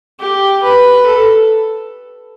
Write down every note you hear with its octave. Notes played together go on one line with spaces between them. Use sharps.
G4
B4
A4